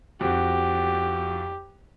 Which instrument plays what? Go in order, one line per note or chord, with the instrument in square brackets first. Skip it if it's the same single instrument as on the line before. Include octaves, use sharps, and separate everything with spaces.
[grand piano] F2 F#4 [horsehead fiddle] G4